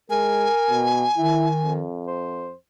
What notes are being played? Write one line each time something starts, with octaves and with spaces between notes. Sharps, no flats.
G#3 A#4 G#5
B2
D#3 E4
F2
C5